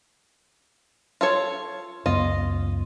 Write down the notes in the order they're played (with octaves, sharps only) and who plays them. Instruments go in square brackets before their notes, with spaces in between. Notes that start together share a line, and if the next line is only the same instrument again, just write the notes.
[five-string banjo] F4 A4 C#5
[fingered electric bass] C#2 F#2 B3 [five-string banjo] F4 D#5